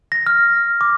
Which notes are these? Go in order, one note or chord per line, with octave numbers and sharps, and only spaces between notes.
A#6
F6
D6